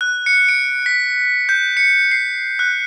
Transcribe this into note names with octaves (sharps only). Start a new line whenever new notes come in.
F#6
C#7
D7
B6
G6
C#7
C7
F#6